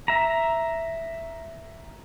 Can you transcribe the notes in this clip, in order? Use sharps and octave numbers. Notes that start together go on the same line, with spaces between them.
E5 A#5